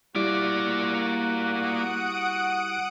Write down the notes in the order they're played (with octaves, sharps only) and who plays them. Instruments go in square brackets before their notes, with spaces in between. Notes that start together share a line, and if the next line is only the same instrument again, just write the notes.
[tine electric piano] G3 E4 G4 [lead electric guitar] A#3 D5 [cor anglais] F#4
[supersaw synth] F#5 D#6 D7